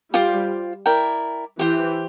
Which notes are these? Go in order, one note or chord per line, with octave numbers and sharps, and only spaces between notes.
G3 F4 C5 G5 D6
E4 A#4 D5 G5
E3 G4 C5 G5